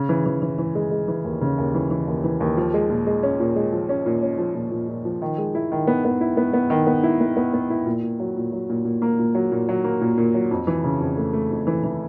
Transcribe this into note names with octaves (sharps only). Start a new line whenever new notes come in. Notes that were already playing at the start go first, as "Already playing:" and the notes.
Already playing: C#3
E3
E3
E3
E3
G#3
G#3
E3
D#2
C#3
D#2
E3
E3
D#2
E3
D#2
F3
G#3
A#2
G#3
C#4
A#2
G#3
F3
C#4
A#2
C#4
F3
A#2
A#2
A#2
F3
D#3
G#3
E4
D#3
B3
B3
E4
B3
B3
D#3
B3
E4
B3
B3
B3
E4
A#2
A#2
F#3
A#2
F#3
A#2
A#2
A#3
A#2
F#3
A#2
F#3
A#3
A#2
A#2
F#3
F2
E3
C#3
F2
A3
A3
F2
E3
E3